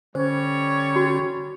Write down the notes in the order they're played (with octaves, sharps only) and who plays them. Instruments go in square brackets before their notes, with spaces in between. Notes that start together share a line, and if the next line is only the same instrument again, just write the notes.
[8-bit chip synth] D3 C#4 [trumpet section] G3 C#5 [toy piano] C5
[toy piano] F#4